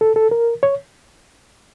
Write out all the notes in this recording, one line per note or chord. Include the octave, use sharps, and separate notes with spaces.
A4
A4
A#4
C#5